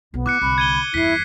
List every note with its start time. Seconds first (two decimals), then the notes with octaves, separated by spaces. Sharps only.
0.14 B1 F2 B3
0.26 E4 D6 F#6 C#7
0.41 C2 D3 B5
0.58 G#6 D#7 G7
0.94 G1 E2 E4 B6 C7